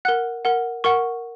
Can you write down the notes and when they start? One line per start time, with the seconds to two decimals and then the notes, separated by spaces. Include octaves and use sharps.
0.05 A#4 F#5 F#6
0.45 A#4 F#5
0.84 A#4 F#5 C#6